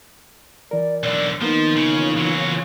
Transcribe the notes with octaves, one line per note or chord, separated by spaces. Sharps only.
E3 A#4 D5
B1 D3 D5
D#3 F3 A#3 B3 D#4 A#4 G6
C#3 E3 F4 C#5
C#3 F#3